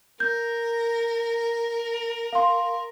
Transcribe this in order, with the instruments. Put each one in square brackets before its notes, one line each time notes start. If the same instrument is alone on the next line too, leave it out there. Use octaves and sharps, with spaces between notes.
[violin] A#4 [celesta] G6
[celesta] F5 C6